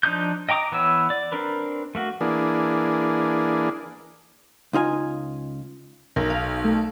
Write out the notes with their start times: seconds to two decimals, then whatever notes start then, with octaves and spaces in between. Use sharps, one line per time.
0.03 F3 D4 D#4 D#6 G6
0.49 D#5 G5 A#5 D6 D#6
0.72 E3 B3 C#5 E6
1.10 D5
1.32 C4 D4 A#4 B4
1.95 A3 A#3 F#4
2.21 E3 A#3 D4 G#4
4.73 C#2 D#4 F4 G#5
6.16 B1 A#4
6.30 F5
6.64 A3